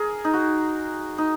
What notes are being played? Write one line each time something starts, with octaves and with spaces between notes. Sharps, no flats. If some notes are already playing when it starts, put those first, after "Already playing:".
Already playing: G#4 A#4
D#4
F#4
D#4